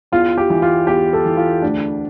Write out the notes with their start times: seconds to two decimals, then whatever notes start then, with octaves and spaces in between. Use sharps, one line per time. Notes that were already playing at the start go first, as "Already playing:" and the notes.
0.12 E2 F4
0.38 G4
0.50 E3
0.62 F4
0.87 E2 G4
1.13 A4
1.25 E3
1.37 F4
1.62 D2 D4